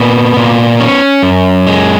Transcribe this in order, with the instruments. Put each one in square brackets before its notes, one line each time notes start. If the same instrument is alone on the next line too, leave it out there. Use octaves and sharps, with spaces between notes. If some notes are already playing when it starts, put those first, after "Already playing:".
Already playing: [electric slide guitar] A#2 B3 G#5
A#2
C#4
F#2
G#3